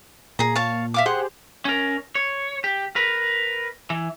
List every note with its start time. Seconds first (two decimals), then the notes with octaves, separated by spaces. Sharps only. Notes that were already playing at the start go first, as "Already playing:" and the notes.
0.39 A#2 G#4 A#5
0.55 C#5 F5 A5
0.94 E5 F5 D6
1.06 G4 G#4 C5 F#5 C6
1.65 C#4 A#4
2.15 C#5
2.64 G4
2.96 A#4 B4
3.90 E3